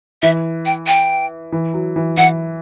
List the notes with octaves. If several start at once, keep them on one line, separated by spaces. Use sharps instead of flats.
E3 E5
G5
G5
E3
F#3
E3
E3 F#5